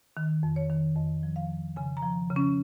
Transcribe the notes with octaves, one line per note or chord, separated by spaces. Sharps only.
D#3
F2
C#5
D#3
F2 D#5
F3
F5
F2
C#3 G#5
A#5
F3
C#3
C#4